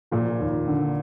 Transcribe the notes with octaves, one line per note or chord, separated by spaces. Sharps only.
A#2 F3
D#2
D3